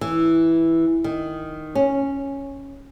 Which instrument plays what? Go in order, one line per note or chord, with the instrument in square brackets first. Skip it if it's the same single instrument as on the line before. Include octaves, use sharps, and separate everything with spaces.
[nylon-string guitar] E3
D#3
C#4